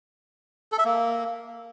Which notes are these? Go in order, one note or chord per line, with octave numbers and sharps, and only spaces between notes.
A4
E5
A#3